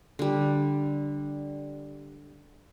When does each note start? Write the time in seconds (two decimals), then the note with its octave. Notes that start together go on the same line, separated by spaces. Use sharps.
0.19 D3 G3